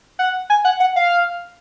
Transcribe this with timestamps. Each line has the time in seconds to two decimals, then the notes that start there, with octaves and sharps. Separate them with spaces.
0.19 F#5
0.50 G#5
0.65 F#5
0.80 F#5
0.96 F5